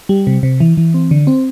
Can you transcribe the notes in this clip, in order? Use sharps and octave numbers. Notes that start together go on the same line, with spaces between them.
G3
C3
C3
E3
E3
C4
D3
C4